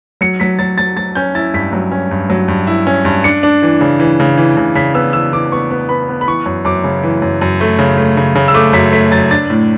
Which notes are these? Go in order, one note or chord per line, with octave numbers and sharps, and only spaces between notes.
F#3 C#7
F#3 B6
F#3 A6
F#3 A6
F#3 A6
C#4 G6
E4 A6
G2 B6
F#3
C#4
G2
F#3
G2
E4
C#4
G2
D4 C#7
D4
E3
C#3
E3
C#3
E3
C#3
C#3 B6
B3 E6
E3 E6
E3 D6
B3 C#6
B3
B3 B5
B3
B5
E3 C#6
F#2
F#2 D6
C#3
E3
F#2
F#2
A3
C#3
A3
C#3
C#3
E6
A3 D6
F#2 B6
A3 B6
F#2 A6
D4 A6
A2